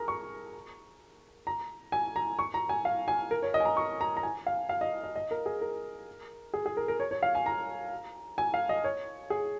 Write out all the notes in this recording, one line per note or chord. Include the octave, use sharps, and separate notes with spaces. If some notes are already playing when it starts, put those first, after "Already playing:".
Already playing: G#4 A#4 A#5
C#6
A#5
G#5
A#5
C#6
A#5
G#5
F5
G#5
A#4
C#5
D#5
G#5
A#5
C#6
A#5
A#5
G#5
F5
F5
D#5
D#5
D#5
A#4
G#4
A#4
G#4
G#4
A#4
A#4
C#5
C#5
F5
G#5
A#5
G#5
F5
D#5
C#5
G#4